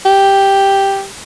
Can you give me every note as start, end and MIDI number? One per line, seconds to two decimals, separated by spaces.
0.05 1.05 67